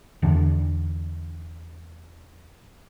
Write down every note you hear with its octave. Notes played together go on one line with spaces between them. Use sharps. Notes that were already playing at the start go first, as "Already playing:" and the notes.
E2 D3 D4